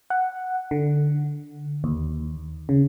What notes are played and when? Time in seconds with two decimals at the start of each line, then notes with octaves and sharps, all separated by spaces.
0.10 F#5
0.71 D3
1.84 D#2
2.69 C#3